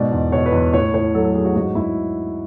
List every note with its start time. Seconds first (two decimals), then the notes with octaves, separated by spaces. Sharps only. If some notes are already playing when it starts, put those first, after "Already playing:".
Already playing: G#2 B2 D5
0.11 E2
0.32 B2 C#5
0.46 B4
0.52 E2
0.73 A2 C#5
0.94 A2 C#5
1.14 F#3 A4
1.25 A4
1.35 F#3 G#4
1.45 F#4
1.56 G#2 F#4
1.75 G#2 E4